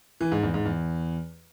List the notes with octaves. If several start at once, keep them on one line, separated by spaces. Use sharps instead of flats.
E3
G#2
E2
G#2
E2